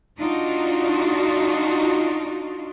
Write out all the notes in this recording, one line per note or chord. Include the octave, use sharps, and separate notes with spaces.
D4 D#4 F4 F#4